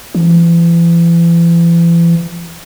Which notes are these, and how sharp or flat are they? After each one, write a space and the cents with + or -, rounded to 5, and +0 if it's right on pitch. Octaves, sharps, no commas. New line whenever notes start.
E3 +40